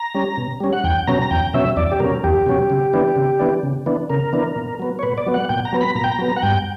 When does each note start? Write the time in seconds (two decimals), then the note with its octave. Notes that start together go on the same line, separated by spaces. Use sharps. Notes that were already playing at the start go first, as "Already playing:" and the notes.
Already playing: A#5
0.14 G3 C#4
0.38 B2
0.60 G3 C#4
0.73 F#5
0.84 E2 G5
1.07 B2 F#3 C#4 A#5
1.22 A#5
1.31 E2 G5
1.54 B2 F#3 C#4 E5
1.76 E2 D5
1.92 G4
2.00 B2 F#3 C#4 A#4
2.24 E2 G4
2.46 B2 F#3 C#4
2.70 C#3
2.93 E3 B3 D4
3.16 C#3
3.40 E3 B3 D4
3.63 C#3
3.86 E3 B3 D4
4.10 C#3 A#4
4.33 E3 B3 D4
4.56 A#2
4.80 F#3 B3
4.99 C#5
5.03 A#2 B4
5.18 D5
5.27 F#3 B3
5.34 F#5
5.49 A#2 G5
5.65 A#5
5.73 F#3 B3
5.81 B5
5.95 A#2 A#5
6.04 G5
6.12 A#5
6.19 F#3 B3
6.36 F#5
6.42 G2 G5